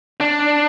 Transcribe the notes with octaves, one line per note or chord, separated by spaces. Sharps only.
D4